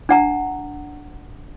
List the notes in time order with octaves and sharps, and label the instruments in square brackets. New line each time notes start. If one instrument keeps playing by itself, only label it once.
[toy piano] D4 F#5 A#5